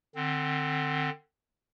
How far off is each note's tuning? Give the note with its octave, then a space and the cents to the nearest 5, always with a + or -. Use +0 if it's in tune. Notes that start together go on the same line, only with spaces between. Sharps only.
D3 +30 C4 +5